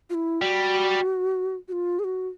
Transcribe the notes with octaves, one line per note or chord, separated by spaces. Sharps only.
F4
E4
G3 F#4
F#4
F4
G#4
F#4